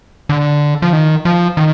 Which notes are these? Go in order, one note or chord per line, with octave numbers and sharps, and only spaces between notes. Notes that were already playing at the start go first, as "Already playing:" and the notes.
D3
F3
D#3
F3
D#3